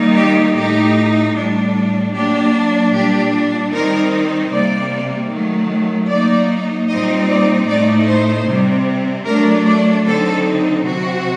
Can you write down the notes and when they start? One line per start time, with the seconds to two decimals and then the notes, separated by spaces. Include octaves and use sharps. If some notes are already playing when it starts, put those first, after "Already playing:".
Already playing: D#3 G3 A#3 D#4
0.16 G4
0.55 A2 A3 D#4 G4
1.34 A2 G3 D4
2.13 F#3 A#3 D4 G4
2.92 A#2 G3 D4 G4
3.72 D#3 G3 C4 D#4 A#4
4.51 C3 G3 A#3 D5
5.31 D#3 F#3 A3
6.09 F#3 A#3 D#4 D5
6.89 A#2 G3 C4 D#4 D#5
7.29 D5
7.68 A2 A3 D#4 D5
8.08 C5
8.47 C3 G3 C4
9.26 F#3 A3 D4 A#4
9.66 D5
10.06 D3 F#3 C4 D#4 A4
10.86 C3 F#3 C4 F#4